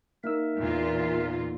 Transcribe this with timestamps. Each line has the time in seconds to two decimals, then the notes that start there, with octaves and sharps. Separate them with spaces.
0.24 A#3 D#4 A#4 E5 E6
0.59 E2 A#2 F4